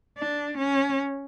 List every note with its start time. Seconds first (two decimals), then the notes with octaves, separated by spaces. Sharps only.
0.18 D4
0.58 C#4